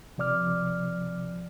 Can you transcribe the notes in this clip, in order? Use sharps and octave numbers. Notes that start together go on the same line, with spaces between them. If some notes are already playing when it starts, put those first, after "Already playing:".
C3 F3 D5 D6 F6